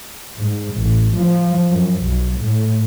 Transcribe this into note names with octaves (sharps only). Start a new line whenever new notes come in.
G#2
A1
F3
F#2
B1
A2